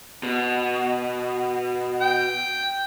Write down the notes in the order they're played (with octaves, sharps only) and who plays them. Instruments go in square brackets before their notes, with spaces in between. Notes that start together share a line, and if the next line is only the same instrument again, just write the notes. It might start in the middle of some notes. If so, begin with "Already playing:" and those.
[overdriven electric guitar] B2
[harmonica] G5